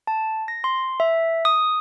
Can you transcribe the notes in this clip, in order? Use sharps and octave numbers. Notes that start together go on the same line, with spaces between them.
A5
A#6
C6
E5
D#6